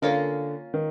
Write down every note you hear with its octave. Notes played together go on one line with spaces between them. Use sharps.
D3 A#3 C#4 F4 A#4
D#3